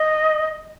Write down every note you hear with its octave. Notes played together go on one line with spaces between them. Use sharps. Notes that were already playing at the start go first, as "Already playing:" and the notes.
Already playing: D#5